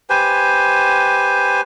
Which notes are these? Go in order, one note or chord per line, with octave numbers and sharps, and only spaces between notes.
G4 B4 C5 G#5